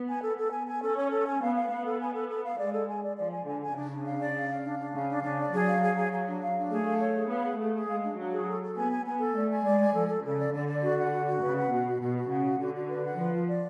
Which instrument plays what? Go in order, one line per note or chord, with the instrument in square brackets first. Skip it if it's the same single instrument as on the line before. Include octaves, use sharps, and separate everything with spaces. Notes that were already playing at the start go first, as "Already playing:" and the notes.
Already playing: [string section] B3
[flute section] G#5
A4
A4
G#5
G#5
[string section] C#4 [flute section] A4
[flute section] C#5
A4
G#5
[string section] B3 [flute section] F5
[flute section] F5
[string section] B3 [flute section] F5
[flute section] A4
G#5
A4
A4
F5
[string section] G#3 [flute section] D5
[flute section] A4
G#5
D5
[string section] F3 [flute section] D5
[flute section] G#5
[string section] D3 [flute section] G#5
[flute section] G#5
[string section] C#3 [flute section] D4
[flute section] D4
F5
D5
F5
F5
D4
D4
[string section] C#3 [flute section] F5
[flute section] D4
[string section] C#3 [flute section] D4
[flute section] D5
[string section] F#3 [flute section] G#4
[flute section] F5
G#4
G#4
G#4
D4
F5
D4
[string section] A3 [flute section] G#4
[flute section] F5
C#5
G#4
[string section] B3 [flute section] F5
[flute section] G#4
[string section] A3 [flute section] G#4
[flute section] G#4
[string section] G#3 [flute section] F5
[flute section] D4
[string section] F#3 [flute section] D4
[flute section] G#4
A4
A4
[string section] B3 [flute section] G#5
[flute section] G#5
[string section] B3 [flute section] G#5
[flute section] A4
[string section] A3 [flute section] D5
[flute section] G#5
[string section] G#3 [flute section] D5
[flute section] G#5
[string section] F3 [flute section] A4
[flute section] A4
[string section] C#3 [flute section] A4
[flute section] D5
[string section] D3 [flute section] D5
[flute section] D5
F#4
F#5
F#4
F#4
[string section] C#3 [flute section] B4
[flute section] F#5
[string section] B2 [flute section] F#4
[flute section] F#4
[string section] B2 [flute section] F#4
[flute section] F#4
[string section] C#3 [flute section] F#5
[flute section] F#4
[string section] D3 [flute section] F#4
[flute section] F#4
B4
F#5
[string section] F3 [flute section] B4
[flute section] F4
D5